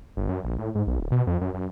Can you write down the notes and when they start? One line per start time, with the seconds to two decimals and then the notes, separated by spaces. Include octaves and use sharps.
0.17 G1
0.29 F#2
0.44 A#1
0.59 A2
0.75 G#2
0.87 B1
1.00 D1
1.12 B2
1.27 F2
1.41 F#2
1.54 F#2